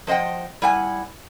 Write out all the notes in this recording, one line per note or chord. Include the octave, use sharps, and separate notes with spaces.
F3 C5 D#5 F#5 G5
G3 E4 F#5 G#5